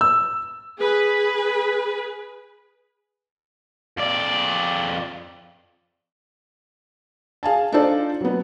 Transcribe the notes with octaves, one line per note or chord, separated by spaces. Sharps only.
E6
G#4 B4
F2 D5
G#4 F5 G#5 A5
D4 D#4 F4 A4 C5 D5
F#3 B3